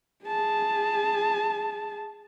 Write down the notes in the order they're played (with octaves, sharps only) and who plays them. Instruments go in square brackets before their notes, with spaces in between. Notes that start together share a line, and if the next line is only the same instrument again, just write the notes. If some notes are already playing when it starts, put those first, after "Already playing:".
[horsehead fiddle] G#4 A5